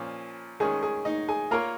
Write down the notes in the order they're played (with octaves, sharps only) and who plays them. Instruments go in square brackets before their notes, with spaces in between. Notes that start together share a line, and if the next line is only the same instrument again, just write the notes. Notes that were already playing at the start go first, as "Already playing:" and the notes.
Already playing: [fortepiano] A#2 F3 C#4
[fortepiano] D#3 G#3 C#4 [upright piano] G#4
[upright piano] G#4
D#4 D#5
G#4 G#5
[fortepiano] A#3 F4 C#5 [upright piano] A#4 A#5